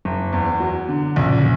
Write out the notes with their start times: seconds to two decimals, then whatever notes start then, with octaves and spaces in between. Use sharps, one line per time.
0.05 F#1
0.33 E2
0.60 F#3
0.89 D3
1.16 A#1 C#3